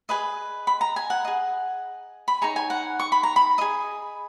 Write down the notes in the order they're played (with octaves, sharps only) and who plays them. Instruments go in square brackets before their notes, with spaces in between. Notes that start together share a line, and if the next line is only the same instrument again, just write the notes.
[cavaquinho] G#4 B4 D#5
B5
A#5
G#5
F#5
G#4 D#5
B5
D#4 G#4 C#5 A#5
G#5
F#5
C#6
B5
A#5
B5
G#4 D#5